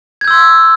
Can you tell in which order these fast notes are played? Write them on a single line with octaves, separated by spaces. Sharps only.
G#6 G6 E6 C6